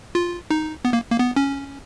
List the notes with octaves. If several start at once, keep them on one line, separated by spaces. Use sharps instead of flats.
F4
D#4
B3
A#3
A#3
B3
C#4